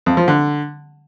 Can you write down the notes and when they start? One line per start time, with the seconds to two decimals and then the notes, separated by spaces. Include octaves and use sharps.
0.06 F2
0.17 F3
0.28 D3